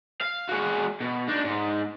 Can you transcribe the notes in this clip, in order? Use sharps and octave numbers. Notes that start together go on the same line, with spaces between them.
F5
G#3 F#4
B2
D4 D#4
G#2